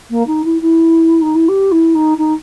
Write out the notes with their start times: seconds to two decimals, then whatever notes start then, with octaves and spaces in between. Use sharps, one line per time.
0.10 A#3
0.27 D#4
0.44 E4
0.62 E4
1.22 D#4
1.35 E4
1.48 G4
1.72 E4
1.95 D#4
2.18 D#4